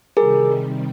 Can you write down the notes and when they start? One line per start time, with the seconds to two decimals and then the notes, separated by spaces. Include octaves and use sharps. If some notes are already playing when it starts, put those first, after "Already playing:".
0.17 C3 D#3 G3 G#4 A#4